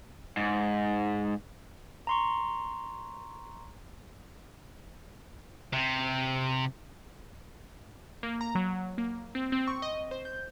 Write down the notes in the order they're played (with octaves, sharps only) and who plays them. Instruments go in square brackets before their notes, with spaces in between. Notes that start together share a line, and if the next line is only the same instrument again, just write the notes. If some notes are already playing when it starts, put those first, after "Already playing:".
[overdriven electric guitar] G#2
[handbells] A#5 C6 C#6
[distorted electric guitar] C3
[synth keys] A#3
A#5
F#3
A#3
C4
C4
C#6
D#5
C5
G6